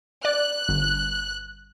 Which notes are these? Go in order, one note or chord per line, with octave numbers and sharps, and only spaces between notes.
D5 F#6
G1